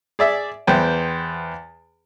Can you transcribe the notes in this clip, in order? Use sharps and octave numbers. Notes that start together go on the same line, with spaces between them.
G#4 D5 E5
E2 B3 C5 G5